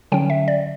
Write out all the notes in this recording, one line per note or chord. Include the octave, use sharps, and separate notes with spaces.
D3 F#3 C#4 G5
E5
D5